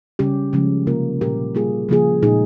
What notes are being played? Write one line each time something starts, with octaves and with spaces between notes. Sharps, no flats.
C#3 G3 C#4 G4
C#3 F3 G#3 C#4
C3 F3 A#3 F4 A#4
A#2 G3 C#4 G4 A#4
G3 A#3 F4 G#4
C#3 F3 A#3 F4 G#4
A#2 G#3 D#4 G#4